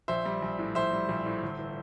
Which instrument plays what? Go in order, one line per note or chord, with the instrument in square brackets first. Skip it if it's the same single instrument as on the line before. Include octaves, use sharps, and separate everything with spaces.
[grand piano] A#1 C5 E5
G3
A#1
A2
A#1 C5 E5
G3
A#1
A2
G1
E3